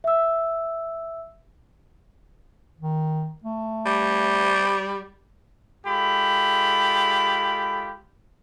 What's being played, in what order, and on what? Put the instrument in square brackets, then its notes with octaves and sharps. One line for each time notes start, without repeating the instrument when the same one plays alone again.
[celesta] E5 E6
[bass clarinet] D#3
A3
[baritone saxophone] G3
[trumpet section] G#3 F4 G4 A4 B5